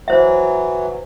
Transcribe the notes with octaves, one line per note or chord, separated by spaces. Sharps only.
E3 F#3 C5 E5